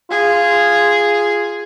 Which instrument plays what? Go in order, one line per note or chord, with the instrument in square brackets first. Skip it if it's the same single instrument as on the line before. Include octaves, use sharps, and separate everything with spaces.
[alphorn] F4 [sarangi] G#4